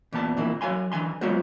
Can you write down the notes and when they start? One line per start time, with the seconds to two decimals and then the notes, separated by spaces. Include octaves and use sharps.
0.13 E2 A#2 B3 A5
0.37 F2 A#2 D3 E3 A#3 E4
0.61 F#3 F5 G#5 C6
0.92 D3 E3 G#5 C6
1.21 F#3 G#3 B3 F4 F#4 C5